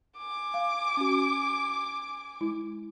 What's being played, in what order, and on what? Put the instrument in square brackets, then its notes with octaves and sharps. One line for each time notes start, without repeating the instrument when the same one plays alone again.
[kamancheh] G#5 D6
[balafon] F5
C#4 F#4
G#3 E4